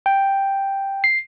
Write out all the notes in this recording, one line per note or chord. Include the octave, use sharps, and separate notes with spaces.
G5
C7